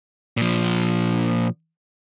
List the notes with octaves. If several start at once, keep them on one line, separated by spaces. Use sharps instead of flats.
A#2 F3